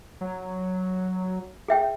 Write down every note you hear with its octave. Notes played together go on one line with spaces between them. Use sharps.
F#3
G#4 E5 G5